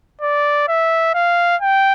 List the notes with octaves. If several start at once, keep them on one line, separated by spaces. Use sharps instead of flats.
D5
E5
F5
G5